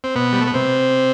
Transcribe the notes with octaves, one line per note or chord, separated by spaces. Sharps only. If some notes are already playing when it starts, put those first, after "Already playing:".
C4
B2 B3
G3
A3
B3
C3 C4